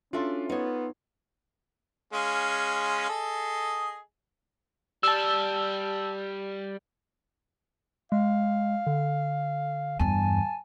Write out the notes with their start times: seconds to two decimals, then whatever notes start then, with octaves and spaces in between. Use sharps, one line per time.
0.13 C#4 D4 F4 F#4 A4 E5 C6
0.49 B3 D#4 C#5
2.13 G#3 C#4 F5
3.09 G#4 A4 D#5
5.03 G3 A5 E6
8.12 G#3 F5
8.87 D3
9.99 E2 G2 G#5 A5